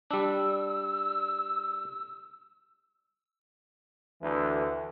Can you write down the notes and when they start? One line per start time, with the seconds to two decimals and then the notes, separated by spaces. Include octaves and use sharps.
0.11 G3 D4 E6
4.22 D2 E3